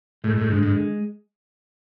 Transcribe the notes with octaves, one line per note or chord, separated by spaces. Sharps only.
A2 G#3
A2
G#2 D3
G#2
G#3